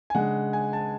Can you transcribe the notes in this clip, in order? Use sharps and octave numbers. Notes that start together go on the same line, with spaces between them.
G#5
C#3 G#3 D4 F#5
G#5
A5